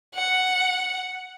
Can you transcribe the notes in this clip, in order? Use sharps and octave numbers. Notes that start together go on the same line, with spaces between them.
F#5